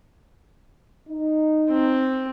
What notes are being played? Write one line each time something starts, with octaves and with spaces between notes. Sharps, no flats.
D#4
C4